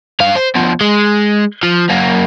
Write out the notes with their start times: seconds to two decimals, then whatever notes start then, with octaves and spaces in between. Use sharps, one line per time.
0.20 G2 F5
0.35 C5
0.55 B2 F3
0.81 G#3
1.63 F3
1.89 F#2 A#3